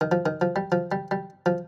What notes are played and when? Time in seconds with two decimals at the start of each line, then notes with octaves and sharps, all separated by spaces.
0.01 D#3
0.12 F3
0.26 D#3
0.41 F3
0.56 G3
0.72 F3
0.92 G3
1.11 G3
1.46 F3